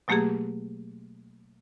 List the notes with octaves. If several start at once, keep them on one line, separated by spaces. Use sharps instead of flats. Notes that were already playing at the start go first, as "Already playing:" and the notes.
B2 F#3 A3 A#3 G4 G#4